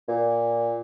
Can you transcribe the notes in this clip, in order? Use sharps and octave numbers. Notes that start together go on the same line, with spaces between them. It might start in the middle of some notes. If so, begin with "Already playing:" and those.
A#2